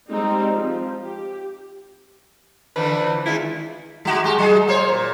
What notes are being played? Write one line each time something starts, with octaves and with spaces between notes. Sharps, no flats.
G3 G#3 C4 D#4
F3
G4
D3 E3 F3 B4
D#3 G#3 E4 F4
G3 F#4
G#3 G4
F#3 G#3 G#4
A#3 C5 C#5
A#2